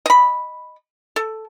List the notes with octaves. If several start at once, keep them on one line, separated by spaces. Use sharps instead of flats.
D#5 B5
A4